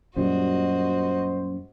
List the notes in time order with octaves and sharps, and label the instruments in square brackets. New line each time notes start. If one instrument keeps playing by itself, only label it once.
[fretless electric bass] F#2 A#2 G3 [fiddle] F#4 D#5 [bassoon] C5